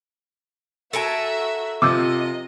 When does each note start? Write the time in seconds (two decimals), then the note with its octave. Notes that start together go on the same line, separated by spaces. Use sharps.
0.93 F#4 A4 A#4 E5 G#5
1.82 C3 F3 D#5 D6 E6 G6